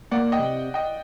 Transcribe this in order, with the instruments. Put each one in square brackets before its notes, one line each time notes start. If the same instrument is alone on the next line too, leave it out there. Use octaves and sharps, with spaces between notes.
[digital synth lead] A#3 [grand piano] D5 F#5
[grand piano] D#5 G5
[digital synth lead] C3
[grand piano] D#5 G5